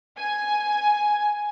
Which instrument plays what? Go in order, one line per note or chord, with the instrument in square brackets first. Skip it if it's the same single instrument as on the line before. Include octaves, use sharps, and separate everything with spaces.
[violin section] G#5